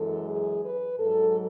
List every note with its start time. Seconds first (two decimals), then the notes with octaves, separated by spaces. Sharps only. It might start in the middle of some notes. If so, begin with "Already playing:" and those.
Already playing: F#2 E3 G#3 A4
0.29 G#4
0.64 B4
0.99 G#2 F#3 A4